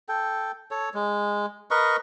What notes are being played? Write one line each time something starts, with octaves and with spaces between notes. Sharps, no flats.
A4 G5
A4 C#5
G#3
A#4 B4 D#5 C#6